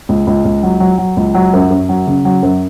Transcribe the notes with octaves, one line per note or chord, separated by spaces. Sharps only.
C#2
C#2
C#2
F#3
F#3
F#3
C#2
F#3
F#2
F#2
F#3
C#3
F#3
F#2